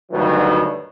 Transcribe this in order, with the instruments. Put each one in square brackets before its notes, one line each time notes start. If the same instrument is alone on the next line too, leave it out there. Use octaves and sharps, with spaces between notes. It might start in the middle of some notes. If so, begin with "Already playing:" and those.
[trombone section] D2 G2 B2 D#3 F#3